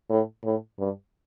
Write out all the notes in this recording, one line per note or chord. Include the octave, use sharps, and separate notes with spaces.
A2
A2
G2